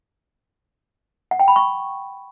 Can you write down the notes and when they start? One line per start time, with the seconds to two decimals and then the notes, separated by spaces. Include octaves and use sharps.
1.31 F#5
1.40 G5
1.48 B5
1.56 C#6